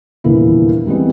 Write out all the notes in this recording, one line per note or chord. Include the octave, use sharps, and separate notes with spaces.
D#1 E2 D3 A#3 E4
E3 G3 G#3 B3 C4